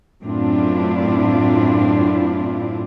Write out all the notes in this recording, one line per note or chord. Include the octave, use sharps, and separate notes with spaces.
F#2 A2 C4 D4 E4 F4